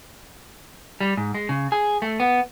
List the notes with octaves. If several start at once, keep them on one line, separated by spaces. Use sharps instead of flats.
G3
G#2
G#3
C#3
G#4
A3
B3